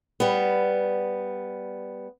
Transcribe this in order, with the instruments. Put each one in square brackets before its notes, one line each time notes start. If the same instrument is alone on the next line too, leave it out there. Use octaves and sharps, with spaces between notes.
[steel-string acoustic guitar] G3 B3